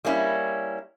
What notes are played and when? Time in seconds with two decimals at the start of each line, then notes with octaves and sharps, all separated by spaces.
0.05 G3 A#3 C#4 E4